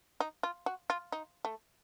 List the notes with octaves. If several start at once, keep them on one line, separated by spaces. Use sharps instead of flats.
D#4
F4
F#4
F4
D#4
A3